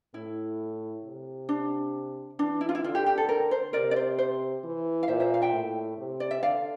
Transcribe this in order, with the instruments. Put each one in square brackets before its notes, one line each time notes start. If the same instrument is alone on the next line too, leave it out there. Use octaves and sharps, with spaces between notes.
[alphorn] A2 [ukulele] E4
[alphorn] C3
[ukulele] D4
[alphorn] E3 [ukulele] D4
[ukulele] E4
F4
E4
[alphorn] D3 [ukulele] F4
[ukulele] G4
G4
A4
A#4
C5
[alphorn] C3 [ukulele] A#4 D5
[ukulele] D5
C5
C5
[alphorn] E3
[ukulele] F5
[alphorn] A#2 [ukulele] C5 E5
[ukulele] C5 E5
F5
E5 G5
[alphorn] A2
C3
[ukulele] D5
E5
[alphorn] D3 [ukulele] D5 F5